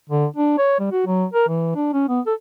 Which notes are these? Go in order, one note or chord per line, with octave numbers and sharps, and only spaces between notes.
D3
D4
C#5
G3
F#4
F#3
A#4
E3
D4
C#4
B3
A4